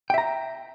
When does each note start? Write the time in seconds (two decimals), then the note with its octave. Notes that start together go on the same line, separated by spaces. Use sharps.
0.10 G5
0.14 E5
0.18 A#5